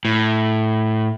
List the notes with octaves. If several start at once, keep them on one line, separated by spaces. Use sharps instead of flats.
A2